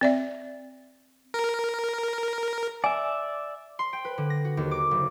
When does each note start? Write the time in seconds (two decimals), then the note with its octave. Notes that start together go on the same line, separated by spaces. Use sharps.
0.01 C4 D5 E5
1.34 A#4
2.84 D5 E5 G#5
3.79 C6
3.93 G5
4.05 B4
4.18 D3
4.30 A#6
4.45 F#4
4.57 D#2
4.71 D6
4.91 F#1